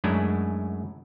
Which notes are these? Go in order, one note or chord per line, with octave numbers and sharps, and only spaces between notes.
F#2 F#3 G#3 A3 D4 E4